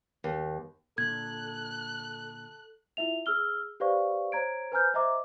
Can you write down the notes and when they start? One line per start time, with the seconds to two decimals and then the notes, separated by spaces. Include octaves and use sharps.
0.24 D#2
0.98 A#2 D3 A4 F#6 G#6
2.97 E4 F4 E5 F7
3.26 G#4 E6 F6 G7
3.80 G4 B4 C5 D5 F5 C#6
4.32 C5 C#5 A#5 G#6 D7
4.72 B4 C5 G#5 A#5 F6 G6
4.94 C5 D#5 E5 A#5 D6